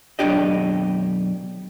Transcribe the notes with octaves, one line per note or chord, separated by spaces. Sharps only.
B1 F#2 D4 G4 D#5